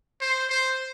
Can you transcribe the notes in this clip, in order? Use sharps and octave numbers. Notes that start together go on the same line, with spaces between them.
C5
C5